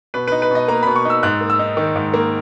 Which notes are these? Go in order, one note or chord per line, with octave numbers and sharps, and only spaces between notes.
B2 B4
D#4 B4
B4
B2 D#5
A#3 A#5
B2 B5
C#6
D#4 E6
G#2 F#6
A#3
E6
D#4
D#3
G#2
A#3